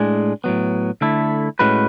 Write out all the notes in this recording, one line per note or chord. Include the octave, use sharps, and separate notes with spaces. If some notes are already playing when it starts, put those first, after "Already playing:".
Already playing: A2 G#3 D4 G#4
A2 F#3 B3
D3 A3 E4 A4
A2 G#3 C#4 F#4 B4